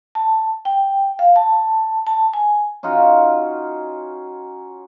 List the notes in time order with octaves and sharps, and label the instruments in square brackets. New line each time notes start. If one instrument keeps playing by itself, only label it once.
[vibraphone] A5
G5
F5
A5
A5
G#5
[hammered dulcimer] C#4 D#4 F4 F#4